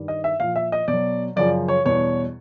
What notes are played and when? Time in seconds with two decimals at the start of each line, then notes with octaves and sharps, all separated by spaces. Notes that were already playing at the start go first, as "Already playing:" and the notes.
Already playing: G2 D#3 G3
0.08 D#5
0.24 E5
0.40 A#2 F3 F5
0.56 E5
0.72 D#5
0.88 B2 D5
0.93 F#3
1.36 F#2 C#3 F3 D5
1.68 C#5
1.85 E2 B2 G3 C#5